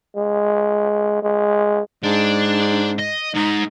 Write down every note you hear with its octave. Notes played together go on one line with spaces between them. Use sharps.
G#3
G#3
G#2 D4
D#5
G#2 D#4